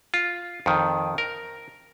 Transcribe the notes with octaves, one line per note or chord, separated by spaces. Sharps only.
F4
F2 D#3
A#4